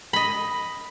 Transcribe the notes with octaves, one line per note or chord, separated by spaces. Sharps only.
D#5 B5